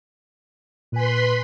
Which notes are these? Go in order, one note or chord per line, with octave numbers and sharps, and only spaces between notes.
A#2 B4 G#5 B5 C6